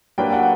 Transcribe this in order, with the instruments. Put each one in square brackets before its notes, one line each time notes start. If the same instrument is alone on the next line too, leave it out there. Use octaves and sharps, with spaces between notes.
[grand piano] F#3 A#3 D4 G4 B4 [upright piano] G5
[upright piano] F#5